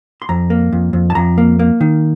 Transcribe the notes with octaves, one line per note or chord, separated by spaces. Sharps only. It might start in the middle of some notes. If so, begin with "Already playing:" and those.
C6
F2 A#5
A#3
F2
F2
A5
F2 A#5
A#3
A#3
D#3